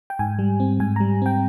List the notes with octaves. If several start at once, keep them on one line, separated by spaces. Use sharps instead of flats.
G5
G#2 G#5
G3
C4
G#2 G#5
G3 A#5
C4 G5